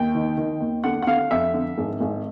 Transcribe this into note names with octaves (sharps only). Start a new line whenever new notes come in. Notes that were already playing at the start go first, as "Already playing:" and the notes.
Already playing: D#2 G5
D#3
D#3
D#2
D3 F#5
F#5
D3 F5
F2 E5
D3
G#1
G#1